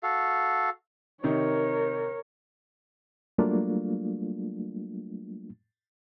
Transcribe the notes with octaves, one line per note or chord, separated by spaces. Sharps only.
F#4 A4 F5
C3 D#3 D#4 A#4 C#5
F#3 G3 A3 A#3 D4 F4